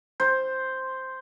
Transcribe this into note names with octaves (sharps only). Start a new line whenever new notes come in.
C5